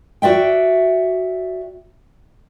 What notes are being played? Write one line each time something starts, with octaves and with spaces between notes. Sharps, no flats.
F#4 D5 E5 G5